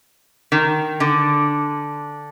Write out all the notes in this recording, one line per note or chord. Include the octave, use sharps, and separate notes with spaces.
D#3
D3